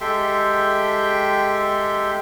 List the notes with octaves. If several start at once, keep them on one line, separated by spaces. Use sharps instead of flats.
G#3 G4 A4 E5 G5 C6